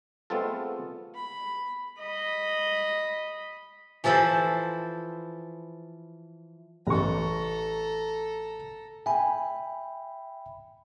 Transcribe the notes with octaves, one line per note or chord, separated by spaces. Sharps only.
G#3 A3 B3 C4 F4 A4
B5
D#5 B5
E3 F3 A4 B4 C5
A1 A4 A#5 C#6
E5 G5 G#5 B5